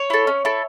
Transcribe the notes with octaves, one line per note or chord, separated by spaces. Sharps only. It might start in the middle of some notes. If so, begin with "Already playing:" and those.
Already playing: C#5
E4 A4
C#4
E4 A4